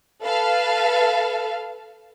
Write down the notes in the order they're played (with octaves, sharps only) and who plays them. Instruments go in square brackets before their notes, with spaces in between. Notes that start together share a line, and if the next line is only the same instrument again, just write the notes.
[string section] A4 B4 F5